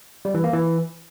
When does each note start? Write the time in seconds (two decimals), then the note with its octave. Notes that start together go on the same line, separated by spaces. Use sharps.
0.25 G3
0.34 E3
0.44 A#3
0.53 E3